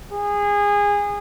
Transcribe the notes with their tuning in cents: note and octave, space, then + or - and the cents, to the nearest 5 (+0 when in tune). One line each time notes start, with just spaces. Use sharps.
G#4 -25